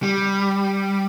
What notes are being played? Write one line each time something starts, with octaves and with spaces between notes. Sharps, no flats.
G3